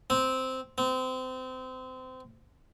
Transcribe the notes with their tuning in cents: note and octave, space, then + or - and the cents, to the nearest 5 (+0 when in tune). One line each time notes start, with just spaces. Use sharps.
C4 -5
C4 -25